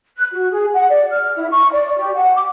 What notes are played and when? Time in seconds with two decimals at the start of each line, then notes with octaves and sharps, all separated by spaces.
0.17 F#6
0.32 F#4
0.51 G#4
0.74 F#5
0.89 D5
1.11 F6
1.36 E4
1.50 C#6
1.73 D5
1.97 G4
2.15 F#5
2.35 D6